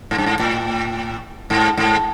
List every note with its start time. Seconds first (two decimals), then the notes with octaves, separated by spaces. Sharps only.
0.11 G#2
0.18 G2
0.26 G#2
0.39 A2
1.50 G#2
1.77 G#2